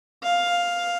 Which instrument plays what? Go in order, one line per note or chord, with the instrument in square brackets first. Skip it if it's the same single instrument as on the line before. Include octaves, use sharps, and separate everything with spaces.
[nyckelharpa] F5